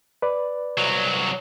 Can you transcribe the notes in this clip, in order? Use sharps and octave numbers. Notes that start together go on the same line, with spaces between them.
B4 D5
C2 F#3